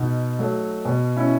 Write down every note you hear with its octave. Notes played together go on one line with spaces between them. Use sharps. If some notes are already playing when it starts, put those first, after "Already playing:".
Already playing: B2 D#4
F#3 A3
B2
C#4 E4